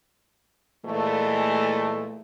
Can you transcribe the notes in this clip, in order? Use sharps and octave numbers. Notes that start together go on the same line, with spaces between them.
A#2 E3 G#3 A3